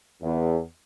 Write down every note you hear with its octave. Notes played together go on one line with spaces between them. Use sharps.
E2